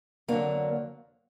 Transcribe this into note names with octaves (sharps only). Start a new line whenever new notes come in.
F2 D3 F#3 A#3 D4